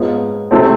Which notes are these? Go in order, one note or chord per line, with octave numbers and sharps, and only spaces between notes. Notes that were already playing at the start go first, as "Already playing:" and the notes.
Already playing: G#2 F3 G#3 B3
C3 E3 A3 C4